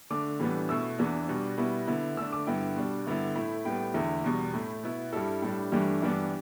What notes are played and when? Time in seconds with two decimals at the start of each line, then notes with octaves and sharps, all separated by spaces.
0.10 D3 A3 D4 D6
0.39 A2 E3 G3 B3 D4
0.69 B2 A3 E4 E6
0.99 E2 E3 B3 D4
1.28 B2 G3 D4
1.58 B2 G3 B3 E4
1.87 D3 B3 E4
2.17 D3 A3 D4 E6
2.32 D6
2.47 G2 D3 B3 E4 G5
2.76 B2 G3 D4
3.06 G2 D3 B3 E4
3.35 A2 A3 E4
3.65 A2 G3 B3 G5
3.94 E2 D3 A3 E4
4.24 E2 B2 G3
4.53 A2 A3 E4
4.83 B2 B3 E4
5.13 G2 G3 E4 A4
5.42 A2 G3 D4
5.72 G2 E3 A3 D4 G4
6.02 G2 E3 B3 D4 G4